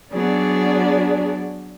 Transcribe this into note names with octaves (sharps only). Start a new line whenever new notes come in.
F#3 B3 D4 G#4 D5